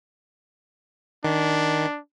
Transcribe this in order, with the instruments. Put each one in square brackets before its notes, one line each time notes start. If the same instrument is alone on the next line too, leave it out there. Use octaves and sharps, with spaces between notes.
[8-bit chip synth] D#3 [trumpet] D4